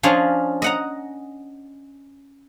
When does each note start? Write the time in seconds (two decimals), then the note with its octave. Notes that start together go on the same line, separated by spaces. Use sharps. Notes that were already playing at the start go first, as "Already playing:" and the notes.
0.03 F3 C#4 D4 F4 G#4
0.62 D#5 F#5 A#5